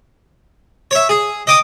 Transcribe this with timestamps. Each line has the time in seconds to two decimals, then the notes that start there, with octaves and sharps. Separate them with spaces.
0.91 C#5 E5
1.09 G#4
1.47 D#5 G5 D6 D#6